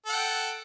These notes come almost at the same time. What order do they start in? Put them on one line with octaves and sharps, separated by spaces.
A4 F#5 G5